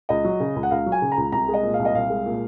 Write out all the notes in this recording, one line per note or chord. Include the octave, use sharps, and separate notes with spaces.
C#2 D#5
F#3
C#3
C#2
F#5
C#2 F5
F#3
G#5
C#3
A#5
C#2
C2 A#5
G#3
D#5
A#2
F5
C2
D#5
C2 F5
G#3
A#2